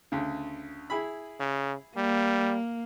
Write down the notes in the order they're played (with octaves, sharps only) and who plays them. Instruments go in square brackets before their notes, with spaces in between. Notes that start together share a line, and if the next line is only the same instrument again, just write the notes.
[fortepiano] D2 C#3
E4 G#4 B5
[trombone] C#3
[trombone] G3 [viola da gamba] A#3